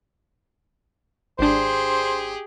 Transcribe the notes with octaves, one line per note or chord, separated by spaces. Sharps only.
G#1 D4 G4 G#4 C5